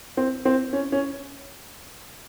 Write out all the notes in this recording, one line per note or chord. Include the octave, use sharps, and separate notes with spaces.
C4
C4
C#4
C#4